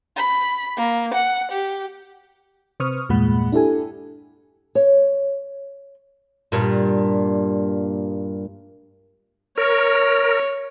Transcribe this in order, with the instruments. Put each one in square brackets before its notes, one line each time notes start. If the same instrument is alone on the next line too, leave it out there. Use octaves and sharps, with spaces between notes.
[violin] B5
A#3
F#5
G4
[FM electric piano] C3 B4 C5 C#6 D#6 F6
E2 G2 A#2 G#3 F#5 B5
D4 E4 G4 A4 G#5
[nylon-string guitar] C#5
[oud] G2 A#2
[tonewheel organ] A#4 [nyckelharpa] C#5